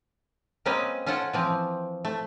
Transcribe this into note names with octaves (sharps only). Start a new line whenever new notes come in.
G#3 A#3 C4 C#4 B4 D#5
C#4 F4 A4 F#5 G5
E3 F3 C4
A3